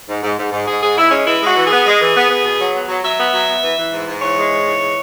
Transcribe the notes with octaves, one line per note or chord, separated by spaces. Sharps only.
G#2
G#2
G#2
G#2
G#2 G#4
G#2 G#4
G#2 E4
G#3 C#4
E3 E4
G#3 F#4
E3
B3 G#4
G#3
E3
B3
B3
B2
F#3
B3
F#3
F#3 E5
B3
F#3
B3
E3
E3
G#2
G#2
E3 C#5
G#3
G#2
E3
G#3